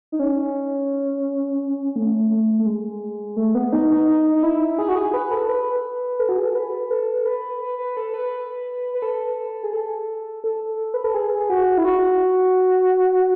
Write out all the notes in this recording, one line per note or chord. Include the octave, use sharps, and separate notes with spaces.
D#4
C#4
A3
A3
A3
G#3
A3
B3
D#4
D#4
D#4
D#4
E4
G#4
F#4
G#4
B4
A4
B4
A4
F#4
G#4
A4
B4
A4
B4
B4
B4
A4
B4
B4
A4
G#4
A4
A4
B4
A4
G#4
F#4
E4
F#4